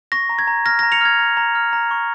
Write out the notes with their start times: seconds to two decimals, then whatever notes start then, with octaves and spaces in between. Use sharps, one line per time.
0.12 C#6 A#6
0.29 A#5
0.39 G#6
0.47 A#5
0.66 F6 A#6
0.79 A#6
0.83 A#5
0.92 C#7 F7
1.01 F6 G#6
1.19 A#5
1.37 A#5
1.55 F6
1.73 A#5
1.91 C#6